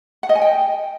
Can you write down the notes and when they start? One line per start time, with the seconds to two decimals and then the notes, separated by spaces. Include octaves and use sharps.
0.23 F#5
0.29 D#5
0.35 G#5
0.42 G5